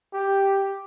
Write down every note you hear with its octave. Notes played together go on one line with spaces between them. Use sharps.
G4